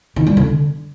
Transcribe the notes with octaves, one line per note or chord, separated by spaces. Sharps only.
D#3
G3
D3